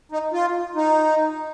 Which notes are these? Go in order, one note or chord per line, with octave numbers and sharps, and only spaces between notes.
D#4
F4
D#4